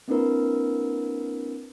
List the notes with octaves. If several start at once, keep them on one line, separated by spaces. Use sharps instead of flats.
A#3 C4 D4 E4 A#4 B4